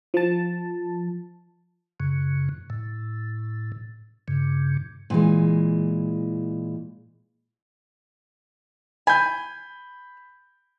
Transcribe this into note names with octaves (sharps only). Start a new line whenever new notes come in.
F3 A5
F#2 C#3
A2
G2 C#3
A#2 E3 G#3
G#5 B5 G6